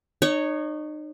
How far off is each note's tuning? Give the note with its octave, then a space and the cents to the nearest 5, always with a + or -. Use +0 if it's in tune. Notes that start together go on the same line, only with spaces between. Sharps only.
D#4 -35 C#5 +0